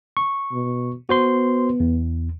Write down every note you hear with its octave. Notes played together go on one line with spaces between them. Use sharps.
C#6
B2
B3 F#4 C5 C6
E2